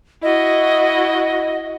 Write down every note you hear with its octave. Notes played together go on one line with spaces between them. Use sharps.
E4 F#4 D#5